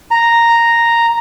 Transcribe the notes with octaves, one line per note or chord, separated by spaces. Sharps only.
A#5